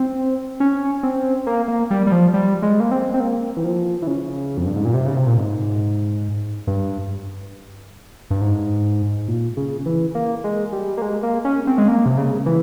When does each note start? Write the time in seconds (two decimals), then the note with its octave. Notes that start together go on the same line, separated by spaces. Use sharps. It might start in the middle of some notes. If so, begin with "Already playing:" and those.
Already playing: C4
0.60 C#4
1.03 C4
1.47 A#3
1.68 A#3
1.91 G3
2.07 G3
2.12 F3
2.34 G3
2.62 G#3
2.80 A#3
2.91 C4
3.14 C4
3.20 A#3
3.57 E3
3.64 F3
4.02 E3
4.07 C#3
4.57 F2
4.66 G2
4.76 G#2
4.85 A#2
4.94 C3
5.06 C#3
5.16 C3
5.27 A#2
5.37 G#2
6.67 G2
8.31 G2
8.41 G#2
9.28 A#2
9.57 C#3
9.86 E3
10.15 A#3
10.44 G#3
10.72 G3
10.97 A#3
11.02 G#3
11.23 A#3
11.45 C#4
11.67 C4
11.78 G#3
11.88 A#3
12.06 C3
12.18 C#3
12.46 E3